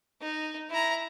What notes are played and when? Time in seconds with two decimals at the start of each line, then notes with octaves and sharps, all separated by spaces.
0.22 D#4
0.70 E4 A#5